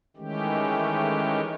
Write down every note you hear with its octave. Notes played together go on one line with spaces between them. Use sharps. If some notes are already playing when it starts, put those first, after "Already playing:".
D#3 E3 G#3 A3 C#4 G4